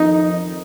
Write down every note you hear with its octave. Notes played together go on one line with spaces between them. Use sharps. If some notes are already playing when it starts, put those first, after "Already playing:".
Already playing: F2 D#3 D#4